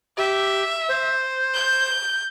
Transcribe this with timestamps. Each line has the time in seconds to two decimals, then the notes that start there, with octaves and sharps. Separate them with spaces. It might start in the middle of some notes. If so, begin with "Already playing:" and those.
0.18 G4 E5
0.89 C5
1.54 G6